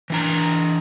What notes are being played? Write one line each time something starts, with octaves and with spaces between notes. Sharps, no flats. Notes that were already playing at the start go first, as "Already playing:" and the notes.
E3 D4 A#5